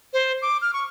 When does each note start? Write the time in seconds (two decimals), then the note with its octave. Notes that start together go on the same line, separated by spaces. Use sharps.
0.13 C5
0.42 D6
0.62 F6
0.73 C#6